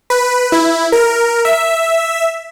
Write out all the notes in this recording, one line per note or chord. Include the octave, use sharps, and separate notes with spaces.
B4
E4
A#4
E5